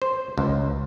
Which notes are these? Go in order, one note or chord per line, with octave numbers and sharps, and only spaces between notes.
C5
C#2